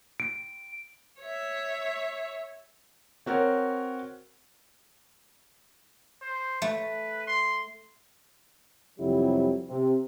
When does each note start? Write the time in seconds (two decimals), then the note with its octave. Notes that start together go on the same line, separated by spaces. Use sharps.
0.20 D7
1.21 C#5 E5
3.26 C4 F#4 A#4 C#5
6.21 C5
6.62 A3 B4
7.27 C6
8.99 F2 C3 F#3 G3 E4 G4
9.70 C3